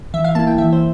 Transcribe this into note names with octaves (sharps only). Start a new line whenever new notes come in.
E3 E5
F5
A#3 E4 A5
G5
E3 E5
C5